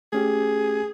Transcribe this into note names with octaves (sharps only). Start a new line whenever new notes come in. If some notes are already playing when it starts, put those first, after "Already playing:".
A3 C#4 G4 G#4